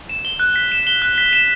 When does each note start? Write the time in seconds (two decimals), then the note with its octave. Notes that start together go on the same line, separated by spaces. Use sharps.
0.09 E7
0.25 G7
0.40 F#6
0.56 B6
0.72 E7
0.87 G7
1.02 F#6
1.18 B6
1.33 E7